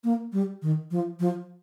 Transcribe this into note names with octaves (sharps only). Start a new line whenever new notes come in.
A#3
G3
D#3
F3
F3